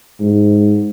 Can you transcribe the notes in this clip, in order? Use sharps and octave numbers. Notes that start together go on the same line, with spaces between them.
G#2